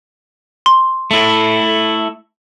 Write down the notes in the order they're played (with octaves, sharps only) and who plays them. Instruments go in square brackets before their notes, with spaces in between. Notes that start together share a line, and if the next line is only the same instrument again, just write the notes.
[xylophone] C6
[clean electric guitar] A3 E4